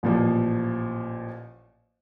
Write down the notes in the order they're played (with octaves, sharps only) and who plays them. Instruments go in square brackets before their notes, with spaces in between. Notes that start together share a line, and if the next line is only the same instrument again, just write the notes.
[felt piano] A1 A#2 F3